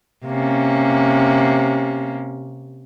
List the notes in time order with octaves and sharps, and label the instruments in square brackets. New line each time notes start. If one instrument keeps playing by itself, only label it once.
[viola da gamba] C3 A#3 C#4